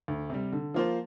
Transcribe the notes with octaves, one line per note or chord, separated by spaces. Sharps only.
D2
C3 G3
D3
F3 A#3 F4 C5